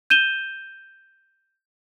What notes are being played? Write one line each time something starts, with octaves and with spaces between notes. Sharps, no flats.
G6 D#7 E7 G7